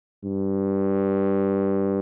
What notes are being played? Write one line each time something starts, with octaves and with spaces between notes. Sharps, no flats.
G2